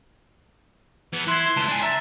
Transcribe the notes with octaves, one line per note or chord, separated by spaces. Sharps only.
E3 B3
E4 C6 F#6 G#6
C#2 E4 A5
D4 G#5
E5 A#5 A6